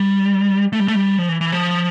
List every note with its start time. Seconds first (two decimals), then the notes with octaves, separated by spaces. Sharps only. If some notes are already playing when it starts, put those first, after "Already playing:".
Already playing: G3
0.73 A3
0.80 G3
0.88 A3
0.95 G3
1.18 F3
1.29 E3
1.41 E3
1.52 F3